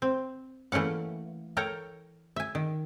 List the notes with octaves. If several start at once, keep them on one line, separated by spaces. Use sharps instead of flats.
C4
E3 A3 A#3 C#4 F#5
A4 A#4 C#5 G5 A#5
E5 G#5
D#3